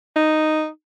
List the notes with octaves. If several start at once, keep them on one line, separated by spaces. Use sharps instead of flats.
D#4